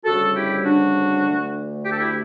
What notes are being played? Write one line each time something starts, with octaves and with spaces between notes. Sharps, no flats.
D2 C#3 G3 F#4 A4
E4 G4
D4 F#4
D2 D3 A3
G4
A4
E4 G4